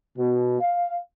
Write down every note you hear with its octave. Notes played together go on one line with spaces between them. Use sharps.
B2
F5